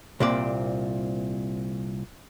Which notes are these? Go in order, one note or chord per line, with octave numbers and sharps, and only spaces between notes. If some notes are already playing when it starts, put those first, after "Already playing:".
C2 A#2 C4 D5